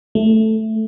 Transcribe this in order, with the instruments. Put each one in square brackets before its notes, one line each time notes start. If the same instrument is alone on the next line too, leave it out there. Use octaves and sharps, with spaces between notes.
[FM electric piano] A3